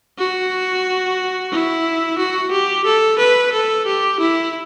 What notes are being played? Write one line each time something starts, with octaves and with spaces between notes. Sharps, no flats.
F#4
E4
F#4
G4
A4
B4
A4
G4
E4